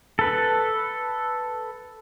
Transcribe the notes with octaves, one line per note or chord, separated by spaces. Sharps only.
A4 B4